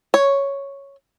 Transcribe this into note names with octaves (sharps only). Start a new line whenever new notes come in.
C#5